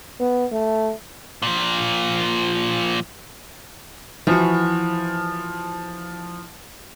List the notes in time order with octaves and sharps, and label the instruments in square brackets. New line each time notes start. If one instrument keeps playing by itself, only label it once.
[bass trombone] B3
A3
[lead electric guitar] A#2 F3
[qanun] E3 F#4 [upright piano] F3